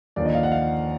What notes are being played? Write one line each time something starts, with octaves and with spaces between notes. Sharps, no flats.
D#2 D3 F3 D5
D#5
F5
F#5
F5